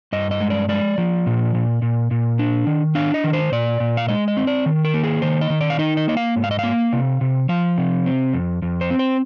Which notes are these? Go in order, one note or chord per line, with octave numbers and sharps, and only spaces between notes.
G2 D#5
D#5
G#3
D5
G#3 D5
F3
A#2
A#2
A#2
A#2
D4
D#3
D4 F5
D#5
D#3
C5
A#2 D5
A#2
F5
G#3 D#5
D#5
C4
D5
D#3
A#4
A#3
G#4
D#3 C5
D#5
D#3
D5
F5
D#4 D#5
D#5
A#3 D#5
F5
G#2
F5
D#5
A#3 F5
C3
C3
F3 F5
C3
C4
F2
F2
C5
C4
C5